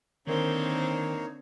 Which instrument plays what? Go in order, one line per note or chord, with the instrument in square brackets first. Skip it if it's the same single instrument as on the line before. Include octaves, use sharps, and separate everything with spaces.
[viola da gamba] D3 C4 [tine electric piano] D#3 A#4 C5 [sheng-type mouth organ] A#3 D#4 C#5